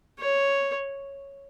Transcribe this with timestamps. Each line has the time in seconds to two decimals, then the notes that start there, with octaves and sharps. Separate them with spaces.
0.19 C#5